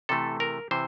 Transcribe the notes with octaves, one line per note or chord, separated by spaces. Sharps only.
C3 E3 A3 A4
A#4
C3 E3 C5